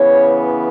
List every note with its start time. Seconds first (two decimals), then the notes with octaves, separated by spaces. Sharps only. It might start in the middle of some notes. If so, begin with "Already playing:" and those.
Already playing: C#3 E3 B3 C#5